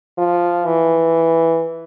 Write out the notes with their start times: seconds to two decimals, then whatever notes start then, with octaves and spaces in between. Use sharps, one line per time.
0.18 F3
0.66 E3